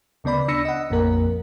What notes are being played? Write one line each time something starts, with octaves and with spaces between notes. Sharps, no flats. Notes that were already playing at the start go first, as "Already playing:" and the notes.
D2 C#3 B3 D5 B5
D4 B5 E6 A#6 C#7
D#5 F#5
A#1 F2 A#3 A#4